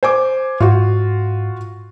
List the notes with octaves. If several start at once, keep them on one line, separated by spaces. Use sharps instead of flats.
C5 G#5 D6
G#2 F4 F#4